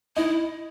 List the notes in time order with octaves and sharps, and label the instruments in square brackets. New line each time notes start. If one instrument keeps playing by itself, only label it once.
[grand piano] D#4 [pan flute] E4